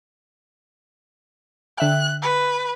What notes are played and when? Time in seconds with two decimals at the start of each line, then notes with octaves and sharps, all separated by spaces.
1.78 D3 E5 G5 F#6
2.22 B4